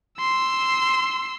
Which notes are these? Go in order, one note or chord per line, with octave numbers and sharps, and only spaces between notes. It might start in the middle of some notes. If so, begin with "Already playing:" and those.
C6 E6